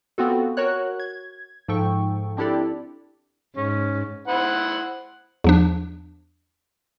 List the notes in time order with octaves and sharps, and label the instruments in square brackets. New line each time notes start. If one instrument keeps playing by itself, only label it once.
[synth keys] B3 C4 F4 F#4 A4
F#4 A#4 C#5 F#6
G#6
G#2 F3 A4 G5 C#6
C4 D4 E4 G4 A4 D5
[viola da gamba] G#2 [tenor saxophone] C#4
[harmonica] E4 C5 F#5
[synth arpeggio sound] E2 F3 D4